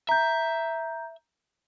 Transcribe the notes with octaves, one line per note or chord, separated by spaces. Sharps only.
E5 A#5 G6